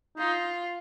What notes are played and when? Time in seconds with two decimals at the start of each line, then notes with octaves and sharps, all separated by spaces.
0.18 D#4 F4